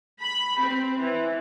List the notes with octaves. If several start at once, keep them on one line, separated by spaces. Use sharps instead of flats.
B5
C4
E3